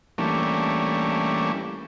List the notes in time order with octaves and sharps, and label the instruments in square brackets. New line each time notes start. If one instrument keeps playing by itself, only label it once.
[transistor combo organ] E3 G3 A3 A#3 C#4 D4